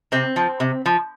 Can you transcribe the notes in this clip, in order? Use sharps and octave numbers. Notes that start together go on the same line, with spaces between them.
C3 C4
F3
C3
F3